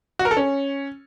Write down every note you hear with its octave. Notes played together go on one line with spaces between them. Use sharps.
F#4
A#4
A4
C#4